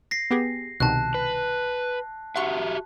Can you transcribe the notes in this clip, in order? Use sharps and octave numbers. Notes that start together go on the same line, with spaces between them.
A#6 C7
B3 G4 G#4
C2 B2 D#3 A5 F#6
B4
F#4 G4 E5 F#5 C6 C#6